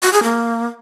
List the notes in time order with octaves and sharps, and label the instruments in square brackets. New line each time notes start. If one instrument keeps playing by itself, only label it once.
[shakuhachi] F#4
G#4
A#3